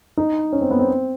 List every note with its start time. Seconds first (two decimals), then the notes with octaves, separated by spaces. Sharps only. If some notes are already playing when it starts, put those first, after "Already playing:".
0.17 D#4
0.53 C#4
0.61 C4
0.71 B3
0.79 C4